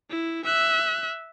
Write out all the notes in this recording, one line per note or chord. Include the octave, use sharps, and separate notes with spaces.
E4
E5 F#6